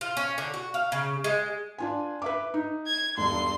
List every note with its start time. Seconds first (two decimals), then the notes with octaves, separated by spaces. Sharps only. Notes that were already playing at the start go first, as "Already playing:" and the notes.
0.01 F4
0.17 C#4
0.38 D3
0.54 F#4
0.74 F5
0.92 C#3
1.24 G#3
1.78 D4 F4 G#5
2.22 B4 E5 D6
2.54 D#4
2.87 G#6
3.18 E1 G2 C6